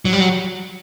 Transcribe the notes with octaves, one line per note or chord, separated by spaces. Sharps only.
F#3
G3
F#3